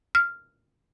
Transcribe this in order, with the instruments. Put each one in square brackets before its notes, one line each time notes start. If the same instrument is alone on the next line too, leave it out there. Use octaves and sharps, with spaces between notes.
[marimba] F6